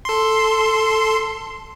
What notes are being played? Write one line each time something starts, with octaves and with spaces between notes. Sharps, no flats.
A4 C6